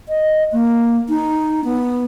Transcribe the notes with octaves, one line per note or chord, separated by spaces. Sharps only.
D#5
A#3
D#4
B3